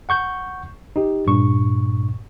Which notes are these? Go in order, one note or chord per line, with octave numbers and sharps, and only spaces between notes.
F#5 C#6 G6
D#4 G4
G2 A#2 C#6